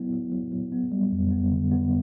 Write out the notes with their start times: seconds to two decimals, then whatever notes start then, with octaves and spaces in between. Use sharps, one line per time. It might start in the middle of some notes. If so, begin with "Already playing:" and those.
Already playing: F#3 B3 E4
0.13 F#3
0.32 F#3
0.52 F#3
0.72 B3
0.92 G3
1.12 F2
1.31 B3
1.52 D3
1.71 B3